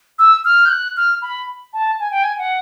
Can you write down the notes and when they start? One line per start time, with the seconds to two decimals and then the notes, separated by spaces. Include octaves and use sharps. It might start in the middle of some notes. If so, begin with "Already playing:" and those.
0.19 E6
0.45 F6
0.65 G6
0.70 F#6
0.97 F6
1.22 B5
1.73 A5
2.00 G#5
2.11 G5
2.23 G#5
2.38 F#5